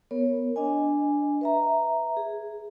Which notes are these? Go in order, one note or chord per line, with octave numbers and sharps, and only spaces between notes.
B3 A#4 C#5
D4 D#5 G#5
B4 E5 A#5
G#4